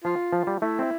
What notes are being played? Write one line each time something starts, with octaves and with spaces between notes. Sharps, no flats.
F3 F4
F3
G3
A3 E4
C4